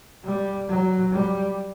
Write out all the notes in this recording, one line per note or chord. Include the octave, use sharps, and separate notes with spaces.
G3
F#3
G3